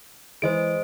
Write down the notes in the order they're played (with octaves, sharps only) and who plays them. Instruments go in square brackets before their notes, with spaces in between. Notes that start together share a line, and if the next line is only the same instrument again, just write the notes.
[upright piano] E3 G#3 [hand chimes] C5 D#5 D7